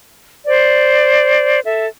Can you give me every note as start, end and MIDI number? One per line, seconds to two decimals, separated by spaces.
0.47 1.60 72
0.47 1.60 74
1.65 1.86 69
1.65 1.86 76